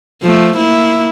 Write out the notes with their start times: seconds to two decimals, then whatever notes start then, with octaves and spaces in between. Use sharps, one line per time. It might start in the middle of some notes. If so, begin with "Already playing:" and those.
0.22 F3 A3
0.57 A#3 E4